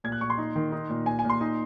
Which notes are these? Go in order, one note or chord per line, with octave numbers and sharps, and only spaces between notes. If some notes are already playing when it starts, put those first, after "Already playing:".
A#2 G#6
F#6
A#2 C#6
C6
D#4
D#3
D#4
A#2
A#2 G#5
G#5
A#2
C6
D#4